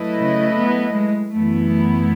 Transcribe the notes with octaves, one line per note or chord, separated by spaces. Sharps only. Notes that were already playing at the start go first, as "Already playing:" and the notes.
Already playing: F#3 A3 E4 B4 D#5
C#3
B3
G#3
F#2 E3 A3 B3 E4
A3